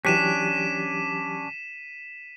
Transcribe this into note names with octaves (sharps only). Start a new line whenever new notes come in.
E3 F#3 C#4 D4 G4 B6 D#7 E7